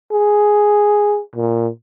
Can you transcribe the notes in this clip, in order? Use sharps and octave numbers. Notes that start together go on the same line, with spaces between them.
G#4
A#2